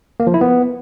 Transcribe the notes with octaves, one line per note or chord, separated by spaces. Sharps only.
A#3
F3
E4
B3